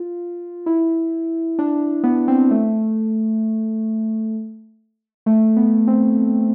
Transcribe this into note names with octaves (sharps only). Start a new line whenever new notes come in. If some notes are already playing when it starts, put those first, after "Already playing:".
Already playing: F4
E4
D4
B3
C4
A3
A3
B3
C4